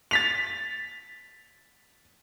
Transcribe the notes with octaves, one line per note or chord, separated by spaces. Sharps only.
A6 B6 F7